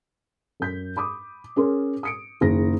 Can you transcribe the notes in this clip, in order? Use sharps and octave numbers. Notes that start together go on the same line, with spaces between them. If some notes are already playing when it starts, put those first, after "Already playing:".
F#2 G6 B6
B5 D6 D#6
C#4 G#4 A#4 C6
D#6 C#7 D7
F#1 D#3 G#4 A#6